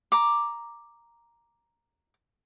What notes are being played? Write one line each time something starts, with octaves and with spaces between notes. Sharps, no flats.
A#5 D6